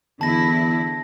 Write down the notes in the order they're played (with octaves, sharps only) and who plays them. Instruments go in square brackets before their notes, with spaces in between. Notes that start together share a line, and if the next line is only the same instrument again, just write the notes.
[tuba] E2 [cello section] D3 E4 [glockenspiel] A5 A#6